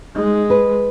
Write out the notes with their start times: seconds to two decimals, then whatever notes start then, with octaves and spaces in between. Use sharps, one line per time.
0.16 G#3 D#4
0.50 B4